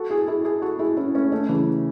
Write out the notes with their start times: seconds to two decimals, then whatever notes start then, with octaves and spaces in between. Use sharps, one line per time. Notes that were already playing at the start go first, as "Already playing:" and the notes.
Already playing: F#4 A4
0.10 E4 G#4
0.27 E4 G#4
0.45 E4 G#4
0.62 F#4 A4
0.79 E4 G#4
0.97 C#4 E4
1.14 A3 C#4
1.32 A3 C#4
1.49 C#3 E3